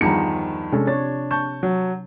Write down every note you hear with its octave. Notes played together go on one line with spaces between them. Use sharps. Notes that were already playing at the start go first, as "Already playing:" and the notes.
E2 G2 D#3 F3 F4 A#5 C#7
C3 G#3 C#4 D4 A4
D4 C#5 A6
A5 C#6 G6
F#3